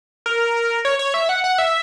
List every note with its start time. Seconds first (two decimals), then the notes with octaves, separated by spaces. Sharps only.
0.26 A#4
0.85 C#5
0.99 C#5
1.14 E5
1.29 F#5
1.44 F#5
1.58 E5